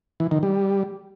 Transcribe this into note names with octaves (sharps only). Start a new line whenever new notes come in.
E3
D#3
G3